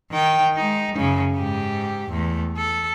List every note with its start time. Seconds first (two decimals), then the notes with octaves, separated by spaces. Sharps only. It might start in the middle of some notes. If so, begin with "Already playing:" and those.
0.12 D#3 G5
0.56 G#3 D#4
0.95 F#2 C#3
1.37 G#2 G4
2.10 E2 A3
2.57 A4